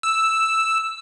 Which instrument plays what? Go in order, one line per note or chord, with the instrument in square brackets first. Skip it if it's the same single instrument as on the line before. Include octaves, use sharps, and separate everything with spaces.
[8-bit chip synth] E6